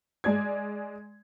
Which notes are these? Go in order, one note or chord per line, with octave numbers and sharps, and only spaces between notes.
G#3 D5 G#6